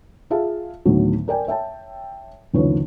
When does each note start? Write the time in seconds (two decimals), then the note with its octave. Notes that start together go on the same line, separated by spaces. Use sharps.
0.30 F4 G#4 E5 F5 A5
0.85 D2 A2 D#3 F#3 B3
1.28 A#4 D5 G5 G#5
1.47 C#5 E5 G5 A5
2.53 F#1 D2 D#3 F3 B4 C#5